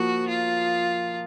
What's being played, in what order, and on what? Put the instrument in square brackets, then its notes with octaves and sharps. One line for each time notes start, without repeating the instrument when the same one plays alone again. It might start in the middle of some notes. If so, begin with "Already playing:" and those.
Already playing: [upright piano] F3 A#3 [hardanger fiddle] F#4
[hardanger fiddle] F4